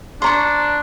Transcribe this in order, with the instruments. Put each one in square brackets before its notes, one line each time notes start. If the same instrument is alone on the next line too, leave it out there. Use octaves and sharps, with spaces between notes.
[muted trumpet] D4 [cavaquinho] C5 A#5 C#6